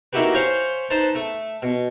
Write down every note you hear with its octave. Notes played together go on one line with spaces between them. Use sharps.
A#3 D#4 E4 F#4 G4 B4
C5 C#5 F5 G5 G#5 B5
D#4 B4 C5 A5
A3
B2